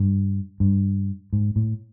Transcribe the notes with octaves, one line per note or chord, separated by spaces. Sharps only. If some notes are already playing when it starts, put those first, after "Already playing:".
Already playing: G2
G2
G#2
A2